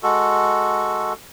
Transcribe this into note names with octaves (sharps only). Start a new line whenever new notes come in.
G#3 F#4 A4